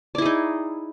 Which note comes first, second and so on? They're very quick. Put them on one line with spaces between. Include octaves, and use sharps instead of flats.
D5 E4 G#4 D#4